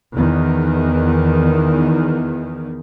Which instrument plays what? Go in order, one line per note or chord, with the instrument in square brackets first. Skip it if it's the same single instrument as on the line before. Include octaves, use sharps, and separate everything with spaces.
[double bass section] E2 D#3